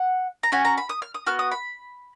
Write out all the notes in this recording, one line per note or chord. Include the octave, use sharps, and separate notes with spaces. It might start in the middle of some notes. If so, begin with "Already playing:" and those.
Already playing: F#5
A#5
C#4 F#4 G#5
A#5
B5
D#6
F6
D#6
B3 F#4 F6
D#6
B5